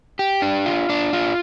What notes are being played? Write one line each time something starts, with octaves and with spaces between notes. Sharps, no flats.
G4
D4
F4
D4
F4